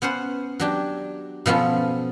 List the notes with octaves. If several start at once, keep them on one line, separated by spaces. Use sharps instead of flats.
B3 C#4 C5 F#5
F#3 D4 G4
B2 F3 B3 C#4 A4